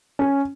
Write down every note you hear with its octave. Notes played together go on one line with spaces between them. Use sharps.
C#4